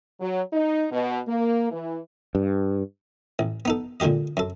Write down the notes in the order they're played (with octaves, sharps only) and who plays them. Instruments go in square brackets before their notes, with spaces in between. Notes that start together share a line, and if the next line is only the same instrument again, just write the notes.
[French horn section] F#3
D#4
B2
A#3
E3
[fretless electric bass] G2
[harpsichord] A1
B3 D#4 A4
A#2 D3 G#3 G4 D#5
F#2 A4